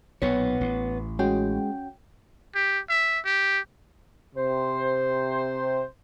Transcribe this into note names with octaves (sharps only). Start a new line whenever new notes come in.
B1 A#2 B3 C#5
A1
G#3 C#4 F#4 G5
G4
E5
G4
C3 C5